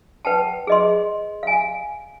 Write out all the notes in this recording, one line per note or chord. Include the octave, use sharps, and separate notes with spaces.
B4 F#5 G5 A5
G#4 D#5 C6
F5 G#5